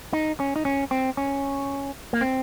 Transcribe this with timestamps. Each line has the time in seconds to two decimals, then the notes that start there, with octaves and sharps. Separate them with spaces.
0.13 D#4
0.40 C#4
0.56 D#4
0.65 C#4
0.91 C4
1.17 C#4
2.13 A#3
2.21 C4